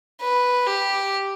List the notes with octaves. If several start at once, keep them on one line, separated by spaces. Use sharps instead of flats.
B4
G4